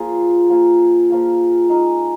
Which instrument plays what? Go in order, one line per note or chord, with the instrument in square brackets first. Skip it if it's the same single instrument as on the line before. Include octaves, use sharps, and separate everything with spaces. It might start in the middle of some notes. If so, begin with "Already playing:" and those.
Already playing: [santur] F3 A#3 F4 G#4
F3 A#3 F4 G#4
F3 A#3 F4 G#4
G#3 D#4 A#4 D#5